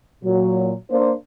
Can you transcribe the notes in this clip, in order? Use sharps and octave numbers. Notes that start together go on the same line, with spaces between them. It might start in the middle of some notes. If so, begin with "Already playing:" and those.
A#2 F#3
A#3 D4 C5